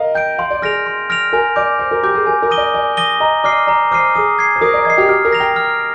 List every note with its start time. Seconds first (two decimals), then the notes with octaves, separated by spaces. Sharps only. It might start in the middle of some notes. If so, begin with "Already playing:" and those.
Already playing: A#4 D#5 F5
0.15 G5 G6 D7
0.38 F5 C6
0.50 D5
0.62 G#4 F6 A#6 D7 F7
0.86 C6
1.10 F6 A#6 D7 F7
1.33 A#4 G#5
1.56 D5 D6 G6
1.79 C5 G#5
1.91 A#4
2.03 G4 D6 G6
2.15 G#4
2.27 A#4 G#5
2.42 A#4
2.51 D#6 A#6 D#7 G7
2.58 D5
2.74 D5 G#5
2.97 D#6 A#6 D#7 G7
3.20 D#5 A#5
3.44 D5 D6 F6 C7 D#7
3.67 D5 A#5
3.91 C5 D6 F6 C7 D#7
4.15 G#4 D#6
4.39 G#6 C7
4.56 C5
4.61 A#4 D#6
4.74 D5
4.85 D#5 G#6
4.90 C7
4.98 G4
5.08 G4 F6
5.25 A#4
5.32 A#6 F7
5.40 G5
5.56 F6